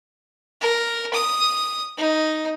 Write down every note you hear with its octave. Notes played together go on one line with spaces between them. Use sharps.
A#4
D#6
D#4